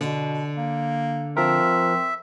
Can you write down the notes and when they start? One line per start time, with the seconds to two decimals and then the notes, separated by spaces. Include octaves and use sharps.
0.01 B2 D3
0.57 A#3
1.37 F3 C4 A#4 E5